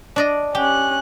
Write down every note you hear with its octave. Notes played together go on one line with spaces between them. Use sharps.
D4 D5 D#5
C#4 G4 F#6